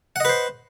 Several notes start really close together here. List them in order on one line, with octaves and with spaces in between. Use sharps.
F#5 D#5 B4 C5